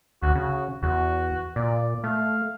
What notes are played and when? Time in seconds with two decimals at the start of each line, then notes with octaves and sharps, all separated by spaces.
0.23 D2 F#4
0.35 C#3 F#4
0.83 E2 F#4
1.56 A#2 D5
2.04 A3 F5